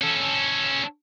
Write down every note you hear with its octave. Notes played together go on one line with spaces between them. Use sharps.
C#4 A4